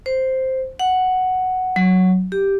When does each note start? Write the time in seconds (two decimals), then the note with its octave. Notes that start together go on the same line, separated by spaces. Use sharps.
0.06 C5
0.79 F#5
1.76 F#3
2.32 G4